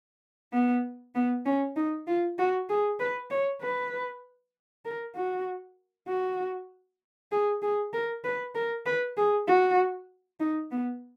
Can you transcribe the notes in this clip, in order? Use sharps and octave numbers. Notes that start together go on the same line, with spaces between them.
B3
B3
C#4
D#4
F4
F#4
G#4
B4
C#5
B4
A#4
F#4
F#4
G#4
G#4
A#4
B4
A#4
B4
G#4
F#4
D#4
B3